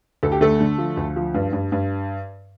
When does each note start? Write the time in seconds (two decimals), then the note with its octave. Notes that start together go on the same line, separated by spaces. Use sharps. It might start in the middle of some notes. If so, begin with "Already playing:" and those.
0.23 D2 A4
0.32 G4
0.41 D3 A3 A4
0.61 D3
0.78 F3
0.97 D2
1.16 F3
1.34 G2
1.53 G2
1.72 G2